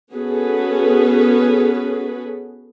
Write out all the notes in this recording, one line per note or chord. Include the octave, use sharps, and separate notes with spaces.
B3 C#4 F#4 G#4 A4 B4